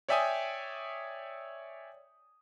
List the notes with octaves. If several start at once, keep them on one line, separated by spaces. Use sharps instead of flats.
C#5 D5 E5 G5 G#5 D#6